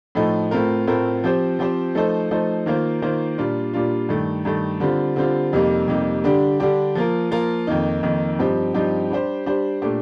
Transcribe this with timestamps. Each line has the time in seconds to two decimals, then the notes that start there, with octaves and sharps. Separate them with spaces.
0.15 A2 F3 A3 D#4
0.51 A2 A3 C4 F4 A#4
0.87 A2 A3 C4 F4 A#4
1.24 F3 C4 G4 C5
1.59 F3 C4 G4 C5
1.95 F3 A3 D#4 A4 C5
2.31 F3 A3 D#4 A4 C5
2.66 D#3 A#3 F4 C5
3.02 D#3 A#3 F4 C5
3.38 A#2 G3 D4 F4
3.74 A#2 G3 D4 F4
4.09 G2 D#3 A3
4.45 G2 D#3 A3
4.80 D3 G3 C4 F4
5.16 D3 G3 C4 F4
5.53 F2 C3 G3 A#3 D#4
5.88 F2 C3 G3 A#3 D#4
6.24 D3 G3 D4 G4
6.60 D3 G3 D4 G4
6.95 F3 A#3 F4 A#4
7.31 F3 A#3 F4 A#4
7.67 F2 D#3 A#3 D#4
8.03 F2 D#3 A#3 D#4
8.39 G2 F3 C4 D#4 G4
8.74 G2 F3 C4 D#4 G4
9.10 G3 D4 G4 C5
9.46 G3 D4 G4 C5
9.82 A#2 A3 D4 G4